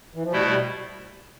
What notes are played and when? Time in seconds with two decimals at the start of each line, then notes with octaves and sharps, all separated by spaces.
0.15 E3
0.24 F3
0.31 B2 G3 A3 E4
0.48 G3